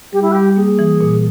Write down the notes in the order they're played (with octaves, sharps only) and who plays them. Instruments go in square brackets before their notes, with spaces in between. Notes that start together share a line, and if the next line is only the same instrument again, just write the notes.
[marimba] G3 [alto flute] G4
[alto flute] E4
[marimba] G3 [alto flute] G4
[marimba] A#3 [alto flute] G#4
[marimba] E3
A#2